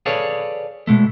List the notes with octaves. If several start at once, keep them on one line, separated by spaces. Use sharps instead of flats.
G#4 A4 B4 C#5 D5 F5
B2 G#3 A3